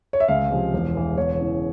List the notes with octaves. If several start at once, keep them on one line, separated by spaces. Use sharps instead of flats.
C#5
E5
C#2 F5
C3 F3 G#3
E1
E2 E3 G#3
E1 C#5
E2 C#3